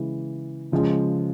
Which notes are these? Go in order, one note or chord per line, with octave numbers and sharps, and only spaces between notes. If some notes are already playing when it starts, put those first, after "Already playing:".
Already playing: C#3 E3 G#3
C#3 F3 G#3 C#4